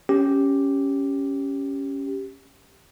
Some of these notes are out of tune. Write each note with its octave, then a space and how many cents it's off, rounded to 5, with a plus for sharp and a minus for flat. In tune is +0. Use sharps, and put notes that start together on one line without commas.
C#4 +0 G4 +0